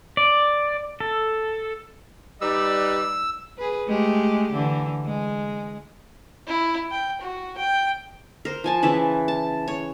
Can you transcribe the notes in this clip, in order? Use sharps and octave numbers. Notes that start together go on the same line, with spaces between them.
D5
A4
G3 D#4 B4 D5 E6
G#4 B4
G#3 A3 G4
D3 E3
G#3
E4
G5
F#4
G5
A#4 C5
F3 G#5 A5
C#3 E3 E5 A5
A5
C#5